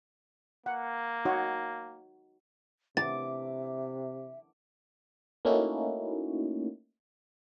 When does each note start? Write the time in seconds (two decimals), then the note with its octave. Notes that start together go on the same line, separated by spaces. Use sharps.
0.66 A#3 F#5
1.25 D#4 F#4 C#5
2.97 C3 E5 D6 A6
5.45 A3 A#3 C#4 D#4 E4 F#4